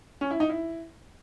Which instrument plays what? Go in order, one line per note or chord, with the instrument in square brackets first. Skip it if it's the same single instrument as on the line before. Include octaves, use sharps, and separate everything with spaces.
[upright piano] C#4
E4
D#4
E4